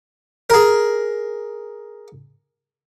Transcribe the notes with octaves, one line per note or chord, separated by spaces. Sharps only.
G#4 A#4